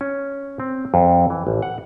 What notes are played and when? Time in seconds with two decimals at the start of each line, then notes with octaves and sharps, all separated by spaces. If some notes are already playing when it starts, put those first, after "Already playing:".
0.01 C#4
0.60 C4
0.94 F2
1.30 E3
1.47 A1
1.62 F#5